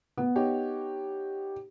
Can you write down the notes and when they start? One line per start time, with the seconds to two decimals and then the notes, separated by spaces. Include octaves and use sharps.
0.17 B3
0.36 D#4 G4 C#5